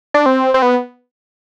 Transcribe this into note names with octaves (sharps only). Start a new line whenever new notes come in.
D4
C4
C4
B3